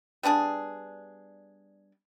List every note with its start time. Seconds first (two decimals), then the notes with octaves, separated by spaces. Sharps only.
0.23 G3 B3 D4 G#4